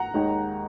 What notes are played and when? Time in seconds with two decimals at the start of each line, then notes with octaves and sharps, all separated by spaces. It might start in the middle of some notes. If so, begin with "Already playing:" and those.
Already playing: F#5 A#5
0.14 D#2 D#3 G#3